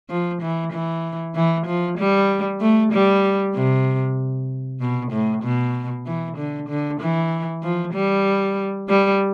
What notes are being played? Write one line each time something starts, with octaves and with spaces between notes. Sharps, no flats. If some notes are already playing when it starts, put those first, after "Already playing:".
F3
E3
E3
E3
F3
G3
A3
G3
C3
B2
A2
B2
E3
D3
D3
E3
F3
G3
G3